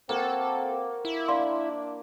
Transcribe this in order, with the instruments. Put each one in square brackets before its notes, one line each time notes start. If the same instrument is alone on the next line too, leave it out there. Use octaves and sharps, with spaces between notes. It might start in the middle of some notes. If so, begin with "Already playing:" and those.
[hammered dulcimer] A#3 F#4 [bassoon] C4 [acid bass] A4
[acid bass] E4
[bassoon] D4 [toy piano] D5 F5 C6